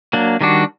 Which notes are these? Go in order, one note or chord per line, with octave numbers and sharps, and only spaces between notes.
F#3 A#3 D4
D#3 G3 D4 F#4